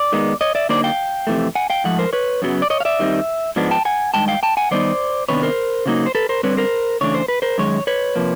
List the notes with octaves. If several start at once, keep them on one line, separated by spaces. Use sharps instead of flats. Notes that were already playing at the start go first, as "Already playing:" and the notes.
Already playing: D5
D#3 G#3 B3 D#4
C#5 D#5
D5 E5
D3 F#3 A#3 D#4 C5 D5
F5 G5
F2 C3 E3 A3
F#5 G#5
F5 G5
G#2 F3 A3 F#5
A#4 C5
B4 C#5
F#2 C#3 F#3 B3
D5
C#5 D#5
F5
D5 E5
D#3 G3 C4 D#4
G#2 F3 G#3 B3 D4
G5 A5
F#5 G#5
G2 D#3 G#3 G5 A5
F5 G5
G5 A5
F#5 G#5
D#3 G3 B3 D#4 C5 D5
C3 D#3 B3 D4 B4 C#5
A#4 C5
C#3 F#3 A#3 D#4
C5
A4 B4
A#4 C5
D3 G3 C4 B4 C#5
A#4 C5
C#3 E3 A3 D4 C#5
C5
B4
A#4 C5
F#2 D#3 G#3 C#5
B4 C#5
C3 F3 A#3